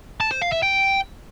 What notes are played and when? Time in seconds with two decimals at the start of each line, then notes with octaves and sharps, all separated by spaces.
0.20 A5
0.31 C5
0.41 F5
0.52 E5
0.63 G5